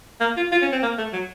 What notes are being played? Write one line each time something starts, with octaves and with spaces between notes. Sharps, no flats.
A#3
F4
F4
C#4
C4
A#3
A3
F#3